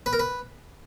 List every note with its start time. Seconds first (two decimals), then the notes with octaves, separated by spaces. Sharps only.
0.06 B4
0.13 A#4
0.19 B4